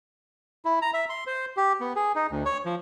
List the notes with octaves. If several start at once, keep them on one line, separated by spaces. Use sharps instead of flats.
E4
A#5
E5
C6
C5
G4
B3
G#4
D#4
D2
C#5
F3